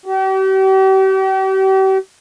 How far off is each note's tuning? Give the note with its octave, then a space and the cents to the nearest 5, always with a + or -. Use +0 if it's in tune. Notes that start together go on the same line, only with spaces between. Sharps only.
G4 -40